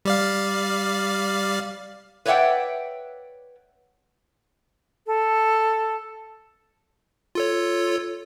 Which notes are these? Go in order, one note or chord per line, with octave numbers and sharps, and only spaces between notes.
G3 D5 F5
B4 C#5 D5 E5 F#5 G5
A4
F4 A4 C#5